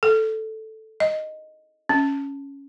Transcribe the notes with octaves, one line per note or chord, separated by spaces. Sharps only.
A4
D#5
C#4